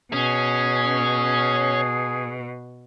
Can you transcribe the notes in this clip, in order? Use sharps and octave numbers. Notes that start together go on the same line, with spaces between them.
B2 C#4 G#4